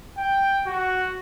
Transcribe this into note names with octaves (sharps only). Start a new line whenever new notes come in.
G5
F#4